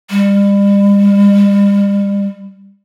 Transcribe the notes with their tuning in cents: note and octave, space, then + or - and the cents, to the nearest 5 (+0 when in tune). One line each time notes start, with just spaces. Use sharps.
G3 +40